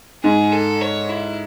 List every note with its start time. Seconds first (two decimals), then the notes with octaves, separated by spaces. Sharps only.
0.24 G#2 G#4
0.52 A4
0.81 C#5
1.10 E4